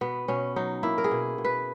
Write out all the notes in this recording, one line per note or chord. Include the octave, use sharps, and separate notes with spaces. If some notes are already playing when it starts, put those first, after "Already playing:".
B2 B3
B2 C#4
F#3 D#4
A#3 E4
A#4
G#4
B2
B2
B4